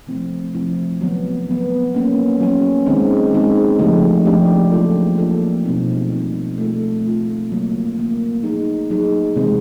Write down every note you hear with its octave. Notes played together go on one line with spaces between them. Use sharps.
C3 F3 A3 C4 E4
C3 F3 A3 C4 E4
D#3 F#3 B3
D#3 F#3 B3
F#3 A#3 C#4
F#3 A#3 C#4
D#3 G#3 C4 D#4
D#3 G#3 C4 D#4
C#3 F3 A3 D4 G4
C#3 F3 A3 D4 G4
F#3 A#3 D4 F4 A4
F#3 A#3 D4 F4 A4
B2 G3 C4 D#4
B2 G3 C4 D#4
A3 C4 F4 A4
A3 C4 F4 A4
C#3 F#3 A#3
C#3 F#3 A#3
F#3 A#3 D#4 G#4
F#3 A#3 D#4 G#4
C3 E3 G#3 C4